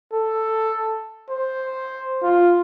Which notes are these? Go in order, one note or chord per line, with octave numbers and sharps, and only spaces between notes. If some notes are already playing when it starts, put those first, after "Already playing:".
A4
C5
F4